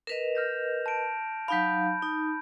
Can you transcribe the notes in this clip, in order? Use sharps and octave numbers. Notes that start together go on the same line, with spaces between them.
A#4 B4 D#5 E7 F7
F6 G6 A#6
A5 D7
F#3 D#4 F5 B5 G6
D#4